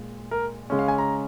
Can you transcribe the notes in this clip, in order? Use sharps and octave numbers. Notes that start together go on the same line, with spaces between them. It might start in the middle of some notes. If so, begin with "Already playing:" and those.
Already playing: A#2 G#3
A#4
C#3 G#3 C#4
F5
G#5
A#5